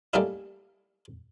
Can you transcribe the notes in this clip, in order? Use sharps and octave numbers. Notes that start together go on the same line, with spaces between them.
G3 A3 A#3 C#4 D#4 E4